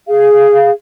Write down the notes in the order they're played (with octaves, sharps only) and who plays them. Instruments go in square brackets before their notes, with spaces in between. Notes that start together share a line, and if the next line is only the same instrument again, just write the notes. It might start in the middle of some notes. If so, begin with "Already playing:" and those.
[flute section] G#4 F5